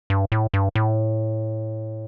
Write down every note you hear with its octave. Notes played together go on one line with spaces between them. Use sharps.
G2
A2
G2
A2